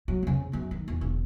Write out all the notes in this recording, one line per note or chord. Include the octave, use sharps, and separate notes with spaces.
F#3
F2 C#3
G1 F#2
D#3
E2
E1 D3